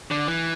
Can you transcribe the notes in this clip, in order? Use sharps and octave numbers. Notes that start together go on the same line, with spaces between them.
D3
E3